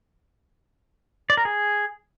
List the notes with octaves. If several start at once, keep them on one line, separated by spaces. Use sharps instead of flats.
D5
A#4
G#4